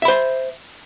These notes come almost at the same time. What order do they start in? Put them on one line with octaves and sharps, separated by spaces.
E5 B5 C5